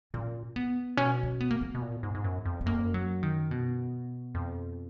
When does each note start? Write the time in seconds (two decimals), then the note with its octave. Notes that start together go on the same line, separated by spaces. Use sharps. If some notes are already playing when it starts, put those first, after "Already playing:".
0.14 A#2 C#4
0.56 B3
0.97 B2 C#4
1.23 C#4
1.40 B3
1.51 A#3
1.61 B3
1.75 B2
1.82 A#2
2.03 G#2
2.15 G#2
2.24 F#2
2.45 F2
2.61 B3
2.66 F#2 A#3
2.73 F2
2.81 F#2
2.94 F#3
3.23 D#3
3.51 B2
4.35 F2